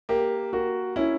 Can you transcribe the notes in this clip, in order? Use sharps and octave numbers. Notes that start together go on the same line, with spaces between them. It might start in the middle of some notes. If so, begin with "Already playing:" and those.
A#3 G4
A#3 F#4
C#4 E4